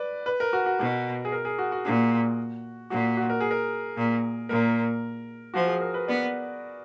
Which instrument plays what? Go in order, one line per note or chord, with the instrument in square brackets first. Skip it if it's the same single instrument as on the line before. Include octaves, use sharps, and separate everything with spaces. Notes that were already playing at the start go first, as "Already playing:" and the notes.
Already playing: [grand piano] B4 D5
B4
A#4
F#4
F#4
[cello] B2 [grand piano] F#4
[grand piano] G#4
A#4
G#4
F#4
F#4
[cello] A#2 [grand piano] F#4
[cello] A#2 [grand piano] F#4
[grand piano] F#4
A#4
G#4
A#4
[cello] A#2
[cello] A#2 [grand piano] A#4
[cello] F3 [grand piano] F#4
[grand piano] G#4
A#4
B4
[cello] B3 [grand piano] D5